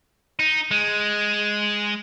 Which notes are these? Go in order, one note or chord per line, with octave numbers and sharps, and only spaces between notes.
D#4
G#3